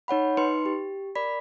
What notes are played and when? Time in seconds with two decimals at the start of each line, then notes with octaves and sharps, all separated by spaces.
0.08 D#4 C#5 F#5 B5
0.37 D#4 B4 C6 C#7
0.66 G4
1.15 A#4 D5 B5 B6